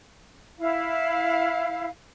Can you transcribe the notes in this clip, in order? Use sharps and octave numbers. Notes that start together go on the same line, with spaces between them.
E4 F5